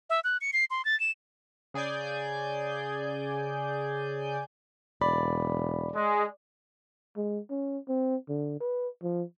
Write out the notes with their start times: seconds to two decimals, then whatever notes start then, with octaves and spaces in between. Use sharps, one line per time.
0.10 E5
0.24 F#6
0.41 C#7
0.53 C7
0.71 C6
0.85 A6
1.00 E7
1.74 C#3 G#4 D5 G#5 G6
5.02 E1 D5 B5
5.95 G#3
7.17 G#3
7.50 C#4
7.89 C4
8.29 D3
8.60 B4
9.02 F3